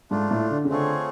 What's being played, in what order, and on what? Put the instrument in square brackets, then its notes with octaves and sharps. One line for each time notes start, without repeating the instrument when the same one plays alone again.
[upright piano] G#2 [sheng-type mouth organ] A3 D4 F4
[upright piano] A2
D3
C#3
[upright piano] D3 [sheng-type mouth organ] A3 C4 F4 G#4 C#5